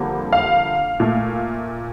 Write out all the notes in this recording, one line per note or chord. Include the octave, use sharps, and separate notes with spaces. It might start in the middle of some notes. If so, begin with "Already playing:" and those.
Already playing: F2 D3 G3 A#3
F5
A#2 A3